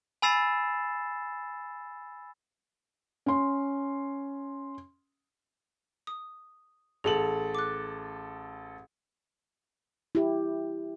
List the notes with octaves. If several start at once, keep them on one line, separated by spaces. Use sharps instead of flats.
G#5 B5 E6 A6 C7 E7
C#4 C6
D#6
A1 G#4 A4 F#7
D6 F#6
E4 G4